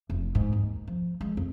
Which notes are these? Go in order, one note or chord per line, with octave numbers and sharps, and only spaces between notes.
F1
G#2
D#2
F3
G#3
F2